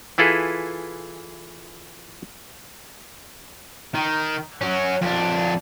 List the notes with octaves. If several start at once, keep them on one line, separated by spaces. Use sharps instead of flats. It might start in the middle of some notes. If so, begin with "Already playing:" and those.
E3 E4 F4 G#4 A4 B4
D#3
F#3 C#4
F2 D4